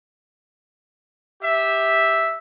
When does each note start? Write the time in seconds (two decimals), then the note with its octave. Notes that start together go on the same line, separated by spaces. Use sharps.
1.42 G4 E5